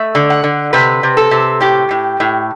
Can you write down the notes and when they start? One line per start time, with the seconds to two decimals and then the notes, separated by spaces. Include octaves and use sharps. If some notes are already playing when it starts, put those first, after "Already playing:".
Already playing: A3 E5
0.15 D3
0.30 F#5
0.44 D3
0.73 C3 B4
1.03 C3
1.17 A4
1.31 C3
1.61 A2 G4
1.91 A2
2.20 A2